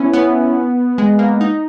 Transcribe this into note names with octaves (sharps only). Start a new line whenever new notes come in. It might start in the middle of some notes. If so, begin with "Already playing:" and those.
Already playing: B3 C#4 E4
B3
G#3
A#3
D#4